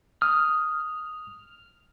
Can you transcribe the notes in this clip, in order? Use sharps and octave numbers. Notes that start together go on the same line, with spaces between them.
D#6 F6